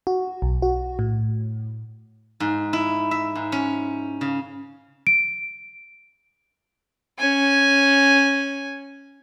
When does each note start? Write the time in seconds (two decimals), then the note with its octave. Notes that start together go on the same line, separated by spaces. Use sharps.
0.07 F#4
0.42 B1
0.62 F#4
0.99 A2
2.40 G#2
2.73 E4
3.11 E5
3.35 G#2
3.52 C#4
4.21 C#3
5.07 D7
7.19 C#4 G#5